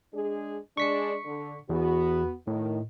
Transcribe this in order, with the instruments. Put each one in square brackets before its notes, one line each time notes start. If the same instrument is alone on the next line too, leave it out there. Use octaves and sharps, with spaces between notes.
[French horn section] G#3 D4 G#4
[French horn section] G#3 D4 G#4 [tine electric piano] C#6 B6 C#7
[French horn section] D3
[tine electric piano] E2 [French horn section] B3 F#4
[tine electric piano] A2 [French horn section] D#3